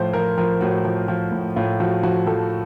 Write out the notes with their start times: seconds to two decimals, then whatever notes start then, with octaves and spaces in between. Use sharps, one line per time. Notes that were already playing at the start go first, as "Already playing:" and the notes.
Already playing: A2 F3 C5
0.13 F3 A#4
0.38 F3 A#4
0.61 A2 F#4
0.85 F3
1.08 F3
1.32 A2
1.56 A2 F4
1.80 F3 F#4
2.03 F3 F#4
2.27 F3 A4